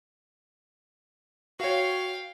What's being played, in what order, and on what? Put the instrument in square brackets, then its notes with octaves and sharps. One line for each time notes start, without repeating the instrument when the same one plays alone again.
[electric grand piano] F#4 C#5 [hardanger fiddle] F5 G5